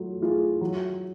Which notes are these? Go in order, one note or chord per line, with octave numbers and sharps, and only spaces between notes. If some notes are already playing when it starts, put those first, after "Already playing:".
Already playing: F#3 A3 F4
A3 F4 G#4
F#3